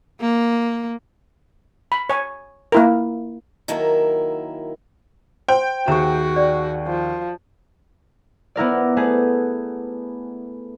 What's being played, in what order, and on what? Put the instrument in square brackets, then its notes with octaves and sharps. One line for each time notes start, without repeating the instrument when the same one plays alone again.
[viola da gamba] A#3
[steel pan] B5
C#5 G#5
A#3 E4 A#4
[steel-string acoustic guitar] D#3 F#3 A#3 E4 A4 A#4
[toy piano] C5 F#5 C6 [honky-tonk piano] G5
[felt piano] D#2 G#4 C#6 [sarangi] F#4 [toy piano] E5 F#5 A#5
[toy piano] D5
[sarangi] F3
[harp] B3 E4 A#4 D5
A3 B3 G#4 B4